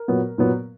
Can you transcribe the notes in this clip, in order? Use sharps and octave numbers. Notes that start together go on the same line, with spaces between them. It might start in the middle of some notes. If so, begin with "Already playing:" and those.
Already playing: A#4
A#2 F#3 B3
A#2 F#3 B3